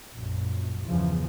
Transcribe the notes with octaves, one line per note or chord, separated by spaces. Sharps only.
A#1 F#2
G1 E2 C#3 E3 F3